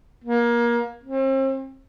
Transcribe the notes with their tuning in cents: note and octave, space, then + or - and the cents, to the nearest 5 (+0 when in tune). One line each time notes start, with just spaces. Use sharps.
A#3 +25
C4 +40